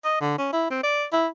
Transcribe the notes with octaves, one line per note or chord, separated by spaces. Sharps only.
D#5
D3
C#4
E4
C4
D5
E4